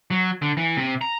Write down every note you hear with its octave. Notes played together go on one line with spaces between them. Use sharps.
F#3
D3
E3
C3
A#5